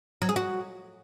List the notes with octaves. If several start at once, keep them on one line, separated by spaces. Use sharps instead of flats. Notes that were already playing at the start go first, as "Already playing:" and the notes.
F#3
G#4
F#4